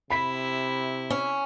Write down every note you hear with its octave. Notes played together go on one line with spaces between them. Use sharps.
C3 E4 B5 B6
C#4